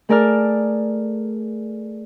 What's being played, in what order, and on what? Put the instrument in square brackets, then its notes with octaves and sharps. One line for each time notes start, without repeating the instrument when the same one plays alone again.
[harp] A3 G#4 A#4 D5 A5 F6